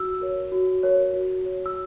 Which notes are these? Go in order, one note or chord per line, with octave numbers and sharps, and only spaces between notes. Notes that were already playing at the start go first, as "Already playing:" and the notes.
Already playing: F#4 E6
A#4 C#5
F#4
A#4 C#5
F#4
C#5
E6